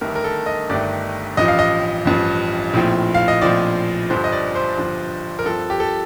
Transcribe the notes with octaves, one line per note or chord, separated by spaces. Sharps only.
G1 G2 D#3 A3 A#4
A#4
A4
D#5
G1 G2 D#3 A3 D5
A1 G2 F3 D#5
F5
D#5
A1 G2 F3
A#1 A2 F3 C4
F5
D#5
A#1 A2 F3 C4 D5
G1 G2 F3 C5
D#5
D5
C5
G1 G2 F3
A#4
G2 F3 C4 A4
G4
A4